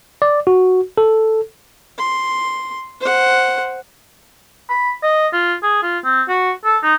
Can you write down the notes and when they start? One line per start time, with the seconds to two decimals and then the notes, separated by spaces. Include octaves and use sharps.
0.22 D5
0.47 F#4
0.98 A4
1.98 C6
3.01 C5 F#5
4.70 B5
5.03 D#5
5.33 F4
5.63 G#4
5.83 F4
6.04 C4
6.29 F#4
6.65 A4
6.83 D#4